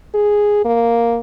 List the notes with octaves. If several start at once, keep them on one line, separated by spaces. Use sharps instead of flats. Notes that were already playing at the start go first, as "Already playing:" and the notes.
G#4
A#3